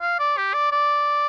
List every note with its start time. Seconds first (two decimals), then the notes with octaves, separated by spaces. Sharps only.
0.01 F5
0.19 D5
0.37 G4
0.54 D5
0.72 D5